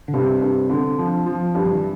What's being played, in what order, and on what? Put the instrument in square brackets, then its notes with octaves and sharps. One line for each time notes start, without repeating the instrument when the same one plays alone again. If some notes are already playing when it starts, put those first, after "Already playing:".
[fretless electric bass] D3
[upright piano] G2 [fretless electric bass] C3
[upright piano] G2
D3
F3
F3
G2
[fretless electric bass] F3
E3